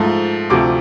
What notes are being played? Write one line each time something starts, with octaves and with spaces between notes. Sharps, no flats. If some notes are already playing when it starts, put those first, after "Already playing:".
Already playing: G#2 F3 A3
D2 C3 F3 D6